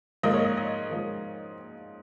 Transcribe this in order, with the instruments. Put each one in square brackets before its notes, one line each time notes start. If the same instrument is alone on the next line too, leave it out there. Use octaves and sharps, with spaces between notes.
[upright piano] G#2 F3 A#3 D#5
C#5
D#5
D#5
G#2 F3 A#3